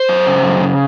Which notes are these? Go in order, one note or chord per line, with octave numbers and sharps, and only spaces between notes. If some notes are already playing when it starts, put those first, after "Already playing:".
Already playing: C5
F#2
C#3
F#2
C#3